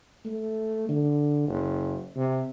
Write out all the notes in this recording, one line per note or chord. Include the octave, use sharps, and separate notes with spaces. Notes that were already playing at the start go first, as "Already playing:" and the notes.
A3
D3
F#1
C3